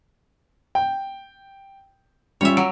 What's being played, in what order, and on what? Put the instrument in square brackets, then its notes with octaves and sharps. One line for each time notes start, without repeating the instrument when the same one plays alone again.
[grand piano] G5
[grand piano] G3 C#4 F4 [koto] C#5 E5
[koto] F#3 [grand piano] D7